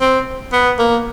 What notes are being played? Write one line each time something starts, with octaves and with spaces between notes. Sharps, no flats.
C4
B3
A#3